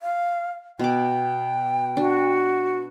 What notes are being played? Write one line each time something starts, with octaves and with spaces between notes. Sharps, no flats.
F5
B2 G5 D6
D4 F#4